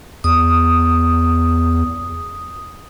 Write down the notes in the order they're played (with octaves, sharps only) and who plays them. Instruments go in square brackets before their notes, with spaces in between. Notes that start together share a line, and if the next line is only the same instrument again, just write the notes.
[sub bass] E2 [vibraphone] D#6